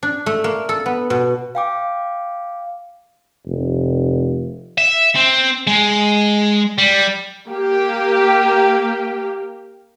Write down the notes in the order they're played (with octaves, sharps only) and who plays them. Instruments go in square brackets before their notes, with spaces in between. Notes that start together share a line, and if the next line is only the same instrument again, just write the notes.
[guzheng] D4
A3
A#3
A4
B3
B2
[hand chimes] F5 G5 D6
[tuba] F1
[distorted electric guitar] E5
C4
G#3
G3
[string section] A#3 G4